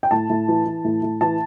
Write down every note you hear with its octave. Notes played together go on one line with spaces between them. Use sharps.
G5
A2 A5
A2
E3
E3
A2
A2
E3 A5